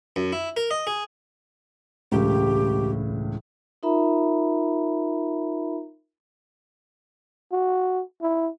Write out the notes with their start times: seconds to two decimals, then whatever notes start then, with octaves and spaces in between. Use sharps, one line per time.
0.16 F#2
0.33 E4
0.57 A#4
0.71 D#5
0.87 G#4
2.12 E1 C#2 A2 G4
3.83 D#4 F4 A#4 E5 A#5 B5
7.52 F#4
8.22 E4